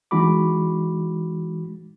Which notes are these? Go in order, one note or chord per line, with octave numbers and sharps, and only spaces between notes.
E3 G#3 D#4 F#4 B5 D6